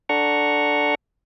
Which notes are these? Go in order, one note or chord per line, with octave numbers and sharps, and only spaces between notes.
D4 A4 F#5 A#5 C#6